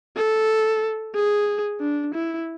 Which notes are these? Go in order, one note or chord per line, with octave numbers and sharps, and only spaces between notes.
A4
G#4
D4
E4